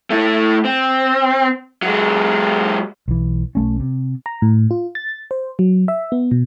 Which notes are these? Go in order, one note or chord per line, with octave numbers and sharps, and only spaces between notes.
A3 E4
C4
F#3 G#3
B1 E3
B1 A3 C#4
C3
A#5
A2
F4
A6
C5
F#3
E5
B3
B2